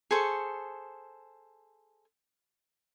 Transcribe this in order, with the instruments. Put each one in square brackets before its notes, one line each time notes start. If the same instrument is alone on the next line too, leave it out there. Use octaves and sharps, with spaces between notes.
[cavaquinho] G#4 A4 C5 C#6